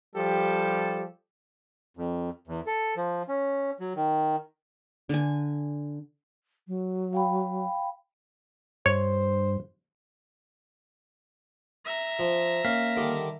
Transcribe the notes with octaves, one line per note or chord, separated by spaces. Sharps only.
F3 G3 G4 A4
F2
E2
A4
F3
C#4
F#3
D#3
D3 G#5
F#3
F5 G5 B5
G2 C5 C#5
E5 A#5
F3
A#3 C#4 F5 B6
D3 D#3 G3